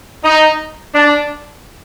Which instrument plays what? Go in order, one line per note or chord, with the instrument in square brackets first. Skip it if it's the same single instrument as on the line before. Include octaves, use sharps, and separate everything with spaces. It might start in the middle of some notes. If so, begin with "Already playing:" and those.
[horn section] D#4
D4